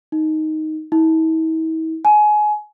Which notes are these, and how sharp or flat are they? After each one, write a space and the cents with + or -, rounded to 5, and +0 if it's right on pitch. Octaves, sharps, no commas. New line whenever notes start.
D#4 +5
E4 -45
G#5 +25